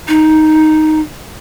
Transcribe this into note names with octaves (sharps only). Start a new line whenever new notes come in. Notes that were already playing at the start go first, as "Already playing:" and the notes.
D#4